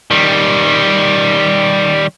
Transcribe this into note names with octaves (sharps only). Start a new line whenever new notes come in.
D#3 G3